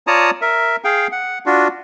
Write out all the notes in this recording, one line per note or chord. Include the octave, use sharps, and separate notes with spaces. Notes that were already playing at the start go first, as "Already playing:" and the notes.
F4 C#5 D5 A5 A#5 D#6
A#4 E5
G#4 F5 G5
F#5
D4 F4 F#4